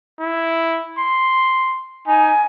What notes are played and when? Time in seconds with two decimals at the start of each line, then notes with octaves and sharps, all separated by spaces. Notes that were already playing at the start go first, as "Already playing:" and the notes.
0.19 E4
0.98 C6
2.07 D#4 G#5